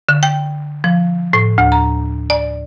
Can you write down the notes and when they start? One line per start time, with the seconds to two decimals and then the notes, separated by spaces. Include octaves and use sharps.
0.09 D3
0.23 G5
0.84 F3
1.33 A2
1.58 D2
1.72 A#5
2.30 D5